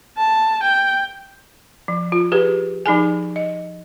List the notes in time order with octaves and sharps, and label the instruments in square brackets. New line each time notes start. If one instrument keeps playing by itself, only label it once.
[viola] A5
G5
[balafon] F3
F4
G4 G#4 B4
F3 D#4 G#4 G#5
D#5